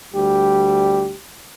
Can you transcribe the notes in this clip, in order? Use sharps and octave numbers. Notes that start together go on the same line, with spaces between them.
D2 G3 G4